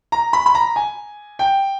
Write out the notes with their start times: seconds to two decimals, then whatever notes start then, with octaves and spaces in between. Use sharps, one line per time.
0.12 A#5
0.33 B5
0.46 B5
0.55 A#5
0.76 G#5
1.39 G5